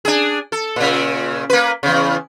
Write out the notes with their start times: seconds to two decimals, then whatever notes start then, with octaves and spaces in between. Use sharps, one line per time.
0.05 D4 G#4
0.52 A4
0.76 A#2 C#3
1.50 A#3 B4
1.83 E2 C#3